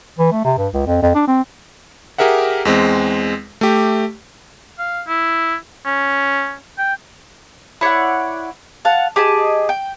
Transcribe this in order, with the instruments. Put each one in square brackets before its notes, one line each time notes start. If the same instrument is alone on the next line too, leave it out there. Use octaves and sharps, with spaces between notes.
[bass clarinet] E3
A3
C3
G2
C#2
F2
F2
D4
C4
[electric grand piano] G4 G#4 A#4 E5 F#5
E2 G#3 C4
A3 G4
[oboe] F5
E4
C#4
G5
[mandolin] E4 C#5 D5 F#5
F5 F#5 A5
G4 G#4 D#5 A5
G5